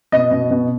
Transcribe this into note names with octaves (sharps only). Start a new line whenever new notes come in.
B2 D#5
B2
B2